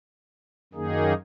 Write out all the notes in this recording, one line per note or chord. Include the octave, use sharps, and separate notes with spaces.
F#2 D#3 A#3 D#4 G#4